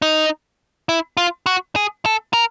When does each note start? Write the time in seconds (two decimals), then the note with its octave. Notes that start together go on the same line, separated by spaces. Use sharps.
0.02 D#4
0.89 E4
1.17 F4
1.46 F#4
1.76 G#4
2.06 A4
2.33 A#4